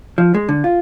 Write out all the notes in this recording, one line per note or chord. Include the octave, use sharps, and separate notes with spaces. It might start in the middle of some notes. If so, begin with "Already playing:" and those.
F3
G#3
D3
F4